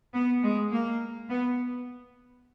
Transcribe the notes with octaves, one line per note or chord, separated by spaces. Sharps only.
B3
G#3
A#3
B3